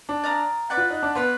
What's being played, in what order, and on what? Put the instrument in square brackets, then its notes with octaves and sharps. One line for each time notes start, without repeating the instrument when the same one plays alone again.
[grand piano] D4
[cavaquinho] D5 F5 A#5 D#6
B4 D5 F#5 D6
[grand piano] F4
D#4
D4
[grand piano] B3 [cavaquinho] F4 B4 D5